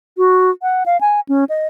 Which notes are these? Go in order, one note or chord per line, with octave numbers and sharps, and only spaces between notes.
F#4
F#5
F5
G#5
C#4
D#5